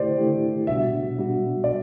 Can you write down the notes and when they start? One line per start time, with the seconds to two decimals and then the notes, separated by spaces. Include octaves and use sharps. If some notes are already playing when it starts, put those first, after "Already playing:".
Already playing: D3 A3 E4 G4 C5 D5
0.18 D3 A3 E4 G4
0.67 B2 G3 D4 F#4 E5
1.18 B2 G3 D4 F#4
1.64 D5